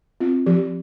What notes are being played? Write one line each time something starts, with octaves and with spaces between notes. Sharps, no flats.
C4 F4
F3 G4